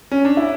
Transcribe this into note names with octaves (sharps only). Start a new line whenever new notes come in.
C#4
D4
E4